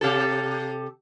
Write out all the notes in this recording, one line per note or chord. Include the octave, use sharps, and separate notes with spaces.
C3 G4 A4